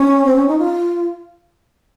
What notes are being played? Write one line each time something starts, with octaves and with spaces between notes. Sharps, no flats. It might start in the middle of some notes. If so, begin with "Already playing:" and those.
Already playing: C#4
C4
C#4
D#4
F4